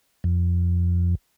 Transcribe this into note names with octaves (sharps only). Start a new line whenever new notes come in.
F2